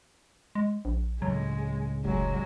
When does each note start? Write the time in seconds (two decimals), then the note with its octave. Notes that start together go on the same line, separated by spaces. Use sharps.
0.55 G#3
0.85 A#1
1.22 C#2 A2 F#3 G#3
2.05 F1 F#3 G#3